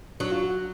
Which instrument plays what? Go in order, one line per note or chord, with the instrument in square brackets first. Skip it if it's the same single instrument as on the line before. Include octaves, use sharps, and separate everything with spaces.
[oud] F#3 [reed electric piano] D4
[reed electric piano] F4
F#4